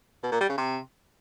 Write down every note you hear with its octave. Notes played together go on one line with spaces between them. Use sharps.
B2
A#2
G3
C#3
C3